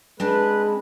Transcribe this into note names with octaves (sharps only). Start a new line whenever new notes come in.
G#3 C4 D4 B4 A5